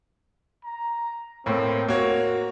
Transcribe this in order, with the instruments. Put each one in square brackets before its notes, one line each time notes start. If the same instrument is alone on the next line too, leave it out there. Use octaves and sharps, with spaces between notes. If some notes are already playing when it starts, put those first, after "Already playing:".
[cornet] A#5
[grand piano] A2 A#3 [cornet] C4
[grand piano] A#3 C#5 [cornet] F#4